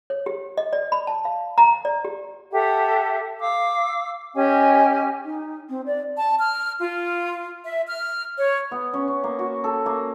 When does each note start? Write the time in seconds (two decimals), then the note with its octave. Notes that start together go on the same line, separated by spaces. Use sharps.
0.10 C#5
0.26 G4
0.58 D#5
0.73 D5
0.92 B5
1.07 A5
1.25 F5
1.58 A#5
1.85 D5
2.05 G4
2.53 G4 A4 E5 F#5
3.40 F5 D6 E6
4.34 C#4 G4 D#5 G#5
5.24 D#4
5.69 C4
5.86 D5
6.17 A5
6.39 F6
6.80 F4
7.65 E5
7.87 F6
8.38 C#5
8.71 B3
8.94 C#4
9.08 C#4
9.24 A#3
9.39 F#4
9.64 A4
9.86 A#3